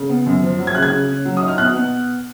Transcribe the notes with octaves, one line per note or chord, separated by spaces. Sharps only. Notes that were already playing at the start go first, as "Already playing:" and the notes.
Already playing: C#3
B3
F#2
F3
F#3
G#6
C#3 F#6
G#6
C#3
C#4
F#3
D#4 D#6
F6
B2 F#6
B3